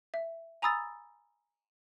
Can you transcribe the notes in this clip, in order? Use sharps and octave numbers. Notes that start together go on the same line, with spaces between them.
E5
G#5 A#5 B5 D#6 E6 A6